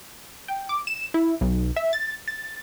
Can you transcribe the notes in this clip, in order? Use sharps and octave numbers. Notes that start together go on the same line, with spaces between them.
G5
D6
E7
E4
B1
E5
A6
A6